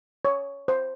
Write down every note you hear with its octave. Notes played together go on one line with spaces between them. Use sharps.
C#5
C5